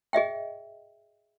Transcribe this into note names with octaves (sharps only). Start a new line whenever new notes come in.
G#4 D#5 E5 G5